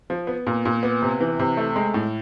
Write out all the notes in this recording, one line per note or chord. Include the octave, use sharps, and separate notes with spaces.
F3
B3
A#2
A#2
B3
C3
E3
C3
A3
G#3
A2